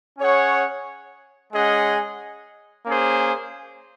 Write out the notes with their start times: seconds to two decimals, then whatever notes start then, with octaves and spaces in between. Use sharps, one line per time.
0.18 C#4 G#4 C#5 F#5
1.53 G#3 C#4 G#4 D#5 F#5
2.86 A#3 C#4 G#4 C5